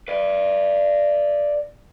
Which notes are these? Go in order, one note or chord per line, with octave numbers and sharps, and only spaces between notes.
B4 D5